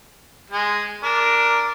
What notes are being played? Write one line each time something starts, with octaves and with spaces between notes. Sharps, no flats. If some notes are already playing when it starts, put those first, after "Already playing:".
G#3
D4 A#4